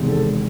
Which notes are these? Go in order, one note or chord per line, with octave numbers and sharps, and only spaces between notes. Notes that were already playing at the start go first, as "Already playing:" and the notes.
Already playing: E1 E2 C3 D#3 G#3
A4